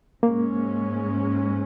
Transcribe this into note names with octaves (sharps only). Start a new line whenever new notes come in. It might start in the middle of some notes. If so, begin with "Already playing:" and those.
G#2 G#3 A#3 C#4